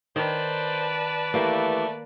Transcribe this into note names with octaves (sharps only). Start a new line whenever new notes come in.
D#3 B4 C5 D5 A5
E3 A3 A#3 E4 G4